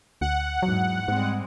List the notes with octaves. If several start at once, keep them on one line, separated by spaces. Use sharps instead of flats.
D2 F#5
E2 G#2 F#3
G#2 G3 G#3 C4